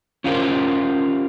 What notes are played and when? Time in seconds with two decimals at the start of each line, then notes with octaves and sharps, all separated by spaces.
0.24 C#4 D#4 F4 G4 A#4 C5